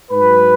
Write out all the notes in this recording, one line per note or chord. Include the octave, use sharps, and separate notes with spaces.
G#2 F#3 B4